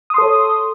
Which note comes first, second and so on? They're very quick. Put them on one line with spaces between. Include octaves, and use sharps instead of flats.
D#6 C6 A4 C#5